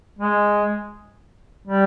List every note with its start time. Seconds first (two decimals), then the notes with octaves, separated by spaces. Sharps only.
0.19 G#3
1.67 G3